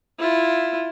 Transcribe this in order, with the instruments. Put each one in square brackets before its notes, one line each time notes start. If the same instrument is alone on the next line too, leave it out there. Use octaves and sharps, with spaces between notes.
[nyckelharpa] E4 F4